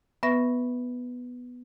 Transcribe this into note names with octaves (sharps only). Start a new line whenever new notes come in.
B3 B4 E5 C#6 A#6